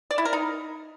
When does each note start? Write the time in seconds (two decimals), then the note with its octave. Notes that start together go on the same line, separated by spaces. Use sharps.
0.11 D5
0.18 E4
0.25 A#4
0.33 D#4